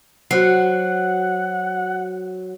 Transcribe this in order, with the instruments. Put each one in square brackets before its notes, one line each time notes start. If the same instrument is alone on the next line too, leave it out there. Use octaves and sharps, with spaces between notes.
[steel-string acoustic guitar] F#3 [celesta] F#4 C5 C7 [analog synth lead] F#5